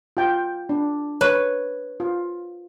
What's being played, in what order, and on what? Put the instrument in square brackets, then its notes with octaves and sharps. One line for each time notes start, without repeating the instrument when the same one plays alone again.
[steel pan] F4 G5
D4
[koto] B4 [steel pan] C#5
[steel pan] F4